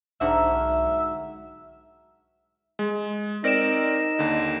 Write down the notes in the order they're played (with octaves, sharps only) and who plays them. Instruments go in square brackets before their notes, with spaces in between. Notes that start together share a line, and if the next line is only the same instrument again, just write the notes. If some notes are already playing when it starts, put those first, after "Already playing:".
[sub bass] B1 [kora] G#2 D3 F#5 [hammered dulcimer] F#4 A#4 C#6 [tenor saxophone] E5
[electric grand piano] G#3
[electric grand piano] C4 A#4 D5 [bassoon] D#4 [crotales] A#6 D7 E7
[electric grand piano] D#2 D3